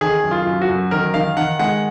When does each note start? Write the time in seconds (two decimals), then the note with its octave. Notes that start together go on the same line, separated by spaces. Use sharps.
0.01 D#3 G#4
0.24 F#2
0.31 F4
0.46 F#2
0.61 F#4
0.69 F#2
0.91 D#3 A#4
1.14 D#3 F5
1.37 D#3 F#5
1.59 G#3 F#5